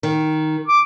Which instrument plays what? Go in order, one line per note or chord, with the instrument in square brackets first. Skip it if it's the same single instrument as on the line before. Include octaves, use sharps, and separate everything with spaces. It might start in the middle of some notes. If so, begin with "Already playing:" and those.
[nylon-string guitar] D#3
[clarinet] D6